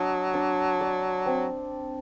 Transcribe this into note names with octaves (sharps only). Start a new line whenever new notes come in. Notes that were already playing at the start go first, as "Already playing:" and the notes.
Already playing: F#3 D4 D#5
D4
D5
C4